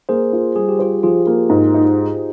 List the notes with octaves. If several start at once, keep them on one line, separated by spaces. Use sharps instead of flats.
A#3 G#4 C5
F4
G3 G#4
G4
F4 G#4 C5
F3 F4 G#4
A#3
G#2
D#4